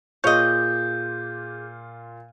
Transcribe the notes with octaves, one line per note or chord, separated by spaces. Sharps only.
A#2 F4 G#4 C#5 D#5 G6